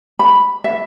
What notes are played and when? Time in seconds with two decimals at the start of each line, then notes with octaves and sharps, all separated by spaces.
0.19 B5
0.64 E5